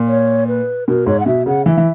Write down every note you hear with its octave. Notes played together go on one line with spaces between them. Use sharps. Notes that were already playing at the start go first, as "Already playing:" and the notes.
Already playing: A#2
C#5
B4
B2 A#4
G#2 C#5
F#5
B2 E5
C#3 F#5
E3 E5
E3